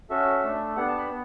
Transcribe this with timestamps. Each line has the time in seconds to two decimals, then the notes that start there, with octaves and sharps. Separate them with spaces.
0.10 C#4 F#4 A4 E5
0.43 A3 D4 A4
0.76 B3 D4 G4 F#5
0.87 A5
0.98 B5
1.09 B3